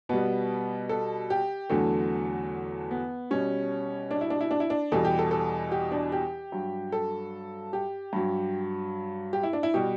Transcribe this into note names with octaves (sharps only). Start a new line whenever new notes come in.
B2 G3 B3
A4
G4
E2 D3 F#3 A3
B3
B2 G3 C#4
D4
E4
D4
E4
D4
E4
D4
E2 B2 G3 A4
G4
A4
A4
G4
D4
G4
G2 F#3
A4
G4
G2 F#3
G4
E4
D4
E4
B2 G3 G4